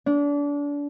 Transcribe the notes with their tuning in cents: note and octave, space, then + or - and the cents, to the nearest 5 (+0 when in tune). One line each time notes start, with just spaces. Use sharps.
D4 -30